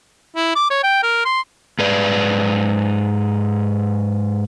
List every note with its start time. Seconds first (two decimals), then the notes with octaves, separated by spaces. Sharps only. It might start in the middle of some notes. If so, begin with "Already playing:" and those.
0.36 E4
0.55 D6
0.70 C#5
0.83 G5
1.03 A#4
1.25 C6
1.79 G#2 B4 D5